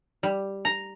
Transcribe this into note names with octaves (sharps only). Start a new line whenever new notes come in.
G3
A#5